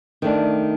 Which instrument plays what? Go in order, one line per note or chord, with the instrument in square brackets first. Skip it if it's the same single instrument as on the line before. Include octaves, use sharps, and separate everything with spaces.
[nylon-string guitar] D#3 A3 D4